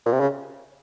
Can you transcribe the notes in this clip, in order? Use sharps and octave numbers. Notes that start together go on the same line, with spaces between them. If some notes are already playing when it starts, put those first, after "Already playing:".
A#2
C3
C#3